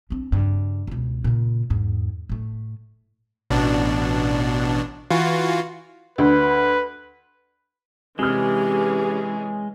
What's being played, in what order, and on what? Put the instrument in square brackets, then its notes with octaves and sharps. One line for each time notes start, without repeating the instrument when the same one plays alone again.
[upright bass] C4 D4
G2 C#3
C#2 B2
A#2 C#3
E2 G#2
A2 A3
[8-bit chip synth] A1 B2 D4
E3 F4 F#4
[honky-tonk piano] D2 [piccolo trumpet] B4
[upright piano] C3 D#6 F6 [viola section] E3 C#4 G#4 [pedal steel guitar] G#3 [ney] G4